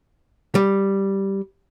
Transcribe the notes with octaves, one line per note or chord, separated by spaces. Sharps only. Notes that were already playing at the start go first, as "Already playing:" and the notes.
G3